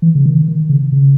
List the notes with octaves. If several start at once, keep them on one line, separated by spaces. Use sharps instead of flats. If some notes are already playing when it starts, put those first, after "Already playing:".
E3
C#3
D#3
D#3
C#3
C#3